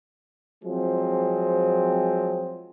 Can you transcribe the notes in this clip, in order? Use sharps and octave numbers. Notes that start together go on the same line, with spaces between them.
F3 F#3 G#3 C4